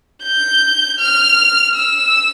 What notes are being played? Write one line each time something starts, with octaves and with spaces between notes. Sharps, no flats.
G6
F6
E6